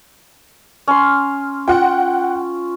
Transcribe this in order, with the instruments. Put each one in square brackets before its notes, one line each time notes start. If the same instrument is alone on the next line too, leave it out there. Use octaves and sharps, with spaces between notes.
[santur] C#4 C6
[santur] F4 [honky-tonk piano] F#5 G5